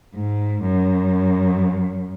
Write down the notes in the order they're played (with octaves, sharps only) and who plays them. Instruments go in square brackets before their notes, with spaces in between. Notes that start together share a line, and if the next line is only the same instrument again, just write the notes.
[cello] G#2
F#2